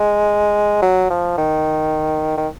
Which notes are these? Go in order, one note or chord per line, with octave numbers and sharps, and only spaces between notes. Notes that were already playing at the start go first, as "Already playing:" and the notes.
Already playing: G#3
F#3
F3
D#3
D#3